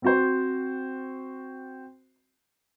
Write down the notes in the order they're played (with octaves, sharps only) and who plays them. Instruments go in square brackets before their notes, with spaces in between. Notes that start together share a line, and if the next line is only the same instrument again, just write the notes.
[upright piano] C4 F#4 C5